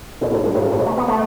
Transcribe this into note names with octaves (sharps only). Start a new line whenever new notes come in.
B2
A2
G2
A2
G2
A2
B2
A3
B3
A3